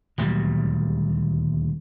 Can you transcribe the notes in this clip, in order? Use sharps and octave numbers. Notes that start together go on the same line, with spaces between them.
D#1 D2 F#3 G3